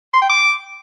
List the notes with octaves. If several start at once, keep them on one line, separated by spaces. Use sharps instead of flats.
C6
G5
D6